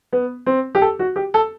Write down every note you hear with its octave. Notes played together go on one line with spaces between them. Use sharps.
B3
C4
G4
A4
F#4
G4
A4